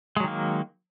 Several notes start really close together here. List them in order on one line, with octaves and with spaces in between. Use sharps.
G#3 F#3 D#3 A#3